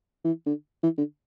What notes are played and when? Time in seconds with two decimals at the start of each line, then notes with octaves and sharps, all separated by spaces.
0.25 E3
0.47 D3
0.83 E3
0.98 D3